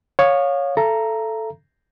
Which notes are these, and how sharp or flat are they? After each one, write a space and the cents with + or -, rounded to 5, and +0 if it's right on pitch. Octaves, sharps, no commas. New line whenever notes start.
C#5 +0 F5 +20 D#6 -40
A4 +0 E5 +40 A#5 +0